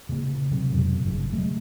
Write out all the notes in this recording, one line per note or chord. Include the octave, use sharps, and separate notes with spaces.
C#3 A#3
C3 F#3
F2 B2 F#3
G1 C#3 F#3
F#3 A3